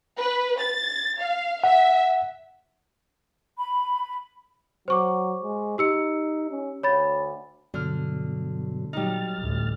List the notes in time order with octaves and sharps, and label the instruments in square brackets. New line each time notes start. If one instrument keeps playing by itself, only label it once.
[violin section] B4
A6
F5
[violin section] E5 [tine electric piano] F#5
[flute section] B5
[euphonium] F#3 [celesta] C5 C#6 D6
[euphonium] G#3
[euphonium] D#4 [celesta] G4 E6 C#7
[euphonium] C#4
[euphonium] D2 [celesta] C#5 B5 A6
[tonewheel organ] G2 B2 F#3 [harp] D3 F6
[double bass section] A#2 F#3 [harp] G3 D#4 [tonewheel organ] F6 A6
[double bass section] A1 D2